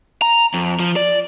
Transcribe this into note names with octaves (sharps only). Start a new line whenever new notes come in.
A#5
F2
F3
D5